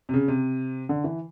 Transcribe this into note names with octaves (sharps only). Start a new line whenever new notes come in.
C3
C#3
C3
D3
E3